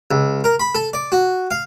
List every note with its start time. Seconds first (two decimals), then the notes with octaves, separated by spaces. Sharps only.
0.11 C#2
0.44 A#4
0.60 B5
0.75 A4
0.93 D5
1.12 F#4
1.51 F5